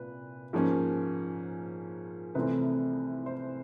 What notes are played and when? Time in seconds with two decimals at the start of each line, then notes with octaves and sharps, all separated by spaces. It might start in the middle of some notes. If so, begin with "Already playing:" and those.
Already playing: C2 A#2 B4
0.53 G#2 F3 A#3 C#4
2.35 C2 C3 E3 A3 C4 B4
3.26 C5